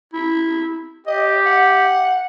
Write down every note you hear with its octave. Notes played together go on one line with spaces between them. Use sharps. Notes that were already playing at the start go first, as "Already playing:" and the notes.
E4
G4 D#5
F#5